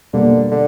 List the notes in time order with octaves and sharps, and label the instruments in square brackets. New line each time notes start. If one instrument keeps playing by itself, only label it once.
[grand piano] B2 G3 A#3 [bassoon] D3
[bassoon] D3